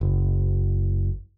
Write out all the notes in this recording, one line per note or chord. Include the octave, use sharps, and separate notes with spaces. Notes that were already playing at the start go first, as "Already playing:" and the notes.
F#1